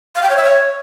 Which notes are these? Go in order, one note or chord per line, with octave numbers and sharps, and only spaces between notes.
F5
G5
C#5
E5
C#5